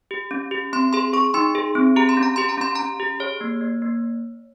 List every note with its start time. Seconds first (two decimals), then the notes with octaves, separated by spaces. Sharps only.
0.11 G4
0.31 C#4
0.51 G4
0.73 C4 C6
0.93 G#4 C6
1.13 G#4 C#6
1.34 D#4 C6
1.55 G#4
1.75 C4
1.96 G4 A#5
2.09 C6
2.17 C#4
2.23 A#5
2.36 G4 C6
2.49 A#5
2.58 C#4 C6
2.75 C#4 A#5
3.00 G4
3.20 G#4 C#5
3.41 A#3
3.61 A#3
3.82 A#3